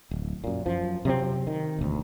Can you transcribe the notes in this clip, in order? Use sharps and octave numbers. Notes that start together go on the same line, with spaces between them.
D1
F#2 A#2
F#2 F3
C3 F#3 G#3 C4
D#3
E1 D2